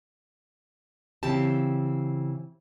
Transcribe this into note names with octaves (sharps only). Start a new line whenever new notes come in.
C#3 E3 C4 C#4 G4 A5